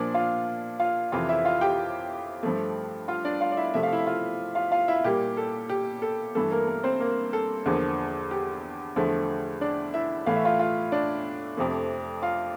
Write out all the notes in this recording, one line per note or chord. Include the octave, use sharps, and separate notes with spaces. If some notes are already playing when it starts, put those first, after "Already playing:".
Already playing: A#2 F3 A#3 D4 D5
F4 F5
F4 F5
F2 C3 E3 F4 F5
E4 E5
F4 F5
G4 G5
G2 F3 A3
F4 F5
D4 D5
F4 F5
D5
E4 E5
C3 F3 A3 E5
F5
E4 E5
F4 F5
F4 F5
F4 F5
E4 E5
A#2 G3 A#3 G4
A4
G4
A4
G2 E3 A3 A4
A#3 A#4
A#3 A#4
C4 C5
A#3 A#4
A4
E2 D3 F3 A#3
G4
E2 D3 F3 A3
D4 D5
E4 E5
A2 E3 A3 F5
E5
F4 F5
F4 F5
D4 D5
F2 C3 F3 A3
F4 F5